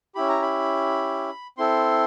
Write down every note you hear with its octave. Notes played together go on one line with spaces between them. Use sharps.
C#4 E4 G4 B5
A#5
B5
C4 E4 A4 C6